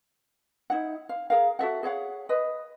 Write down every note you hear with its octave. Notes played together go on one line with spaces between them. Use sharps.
D#4 E4 F#5
F5
G#4 A#4 F5
F#4 A4 E5 F#5
G#4 C#5 F5 F#5
B4 D#5